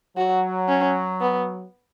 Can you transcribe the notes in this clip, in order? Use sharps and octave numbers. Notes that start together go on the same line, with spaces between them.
F#3 F#4
C#4
B3